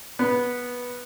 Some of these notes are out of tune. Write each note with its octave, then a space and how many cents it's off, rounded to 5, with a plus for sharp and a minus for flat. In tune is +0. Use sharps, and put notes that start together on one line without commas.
B3 -10